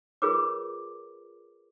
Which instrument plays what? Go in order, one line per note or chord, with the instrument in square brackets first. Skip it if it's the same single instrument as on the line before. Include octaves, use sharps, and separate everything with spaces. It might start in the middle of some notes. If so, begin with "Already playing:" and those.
[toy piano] F4 G#4 A#4 B4 C#5 D6